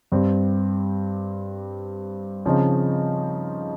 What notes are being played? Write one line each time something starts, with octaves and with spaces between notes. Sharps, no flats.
G2 G3 C4
C#3 F3 C4 D#4